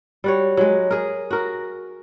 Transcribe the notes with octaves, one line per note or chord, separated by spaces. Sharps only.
G3 F#4 C#5
F#3 G#3
G#4 A#4
F#4 A#4